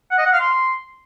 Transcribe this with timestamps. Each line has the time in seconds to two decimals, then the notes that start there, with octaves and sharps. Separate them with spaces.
0.11 F#5
0.18 D#5
0.26 F#5
0.33 F5
0.40 C6